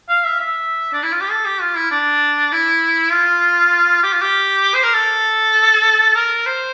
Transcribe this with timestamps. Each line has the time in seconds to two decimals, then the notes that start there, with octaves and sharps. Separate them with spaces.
0.09 F5
0.24 E5
0.39 E5
0.93 D4
1.03 E4
1.12 F4
1.21 G4
1.31 A4
1.45 G4
1.61 F4
1.75 E4
1.91 D4
2.52 E4
3.12 F4
4.03 G4
4.13 F4
4.22 G4
4.74 C5
4.84 A#4
4.94 A4
6.15 A#4
6.46 C5